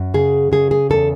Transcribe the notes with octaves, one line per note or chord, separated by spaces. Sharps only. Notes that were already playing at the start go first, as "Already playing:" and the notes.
Already playing: F#2
C#3 G#4
C#3 G#4
G#4
E2 A4